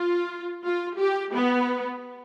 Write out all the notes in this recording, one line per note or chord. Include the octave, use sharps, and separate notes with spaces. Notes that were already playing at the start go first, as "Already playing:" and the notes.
Already playing: F4
F4
G4
B3